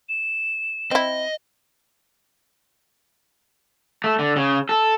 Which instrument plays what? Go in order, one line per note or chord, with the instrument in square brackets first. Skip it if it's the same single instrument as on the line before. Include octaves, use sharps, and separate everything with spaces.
[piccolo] E7
[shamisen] C4 E4 [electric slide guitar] D#5
[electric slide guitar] A3
D3
C#3
A4